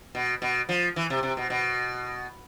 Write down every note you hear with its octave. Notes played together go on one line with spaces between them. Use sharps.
B2
B2
F3
E3
C3
C3
B2
B2